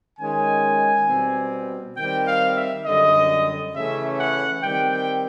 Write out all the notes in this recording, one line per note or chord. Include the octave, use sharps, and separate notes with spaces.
D#3 G#3 C#4 G#5
B2 G3 C4
D#3 G3 C4 G5
F5
E5
F#2 D3 G3 D#5
C#3 E3 A3 C#4 E5
F#5
D#3 G3 C4 G5
G5